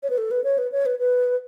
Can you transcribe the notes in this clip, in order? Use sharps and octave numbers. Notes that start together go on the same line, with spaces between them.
C#5
B4
A4
B4
C#5
B4
C#5
B4
B4